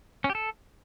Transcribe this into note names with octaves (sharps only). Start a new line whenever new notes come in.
C#4
G4
A4